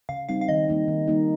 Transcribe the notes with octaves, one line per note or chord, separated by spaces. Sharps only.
C#3 F5
G3 C4 D#4 F5
F5
D#3 D#5
G3 A#3 D#4
D#3
G3 A#3 D#4